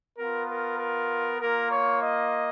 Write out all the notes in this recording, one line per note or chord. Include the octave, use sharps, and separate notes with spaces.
B3 F4 A#4
A#4
A#4
A#3 F4 A#4
C#5
D#5